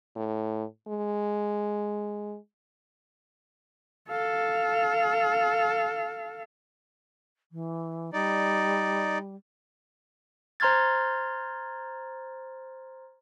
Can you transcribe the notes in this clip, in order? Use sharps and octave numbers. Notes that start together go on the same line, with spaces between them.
A2
G#3
A4 F5
E3
G3 D#4 D5
C5 A#5 C6 F6 G#6 A6